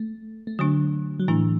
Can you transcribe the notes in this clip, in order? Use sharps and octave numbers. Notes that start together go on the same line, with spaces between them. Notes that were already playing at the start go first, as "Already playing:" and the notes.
Already playing: A3
A3
D3 F#3 A3 D4
F#3
A2 E3 A3 D4